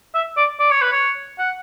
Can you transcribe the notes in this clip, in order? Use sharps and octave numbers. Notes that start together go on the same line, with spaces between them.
E5
D5
D5
C#5
B4
C#5
F#5